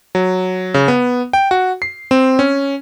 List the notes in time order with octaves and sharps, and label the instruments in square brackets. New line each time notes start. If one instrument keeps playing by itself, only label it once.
[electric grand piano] F#3
C#3
B3
G5
F#4
C7
C4
C#4